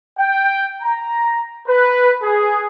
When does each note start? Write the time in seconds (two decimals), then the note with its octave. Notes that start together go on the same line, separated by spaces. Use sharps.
0.18 G5
0.82 A#5
1.67 B4
2.22 G#4